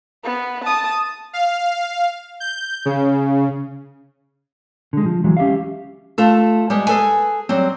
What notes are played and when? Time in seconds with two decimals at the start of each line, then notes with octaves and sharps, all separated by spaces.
0.24 B3
0.64 A5 D#6
1.33 F5
2.40 G6
2.85 C#3
4.93 D3 G#3
5.06 F3
5.24 D2 E3 F#3 G#3
5.37 C#4 G4 E5 F5
6.18 A3 F4 A4
6.70 G3 G#3 B3
6.87 G#4 A4 B4 G#5
7.49 F#3 G3 C4